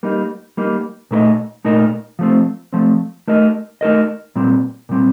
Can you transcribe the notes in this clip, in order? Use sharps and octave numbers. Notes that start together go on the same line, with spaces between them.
G3 A#3 D#4
G3 A#3 D#4
A#2 A3 D#4 A#4 D#5
A#2 A3 D#4 A#4 D#5
F3 A3 C4
F3 A3 C4
A3 D#4 A#4 D#5
A3 D#4 A#4 D#5
A#2 G3 C4
A#2 G3 C4